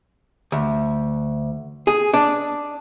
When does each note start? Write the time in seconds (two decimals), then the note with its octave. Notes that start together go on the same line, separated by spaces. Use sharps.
0.52 D2
1.87 G#4
2.14 D4